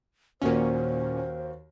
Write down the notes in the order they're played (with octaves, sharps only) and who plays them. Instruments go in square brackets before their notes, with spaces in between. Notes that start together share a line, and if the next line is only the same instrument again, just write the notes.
[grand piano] D#2 F#4 A#4 [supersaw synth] A#2 C#4 [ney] C5